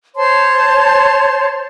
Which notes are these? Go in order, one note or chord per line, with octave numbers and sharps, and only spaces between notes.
C5 C#5 A5 C6